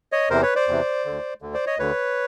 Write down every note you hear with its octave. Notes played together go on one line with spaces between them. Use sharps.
C#5 D#5
E2 C3 E3 A#4 C5
B4 C#5
C5 D5
E2 C3 E3
D2 D3
D2 D3
C5 D5
C#5 D#5
D2 D3 B4 C#5